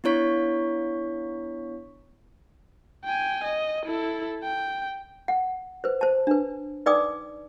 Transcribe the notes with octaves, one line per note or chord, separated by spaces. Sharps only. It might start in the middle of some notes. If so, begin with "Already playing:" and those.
B3 D4 E4 C#5 C#6 B6
G5 G#5
D#5
E4 A4
G5
F#5
B4 C5
C5 A5
D4 B4
D#4 B4 D5 G5 D6 D#6